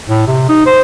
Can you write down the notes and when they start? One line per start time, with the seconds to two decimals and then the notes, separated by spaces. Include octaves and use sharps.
0.09 A2
0.27 C3
0.49 D#4
0.66 C5